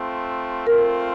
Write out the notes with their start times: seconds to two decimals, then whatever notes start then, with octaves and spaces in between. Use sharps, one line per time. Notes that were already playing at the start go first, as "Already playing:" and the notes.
Already playing: A3 C4 F4
0.67 A3 C4 F4 A#4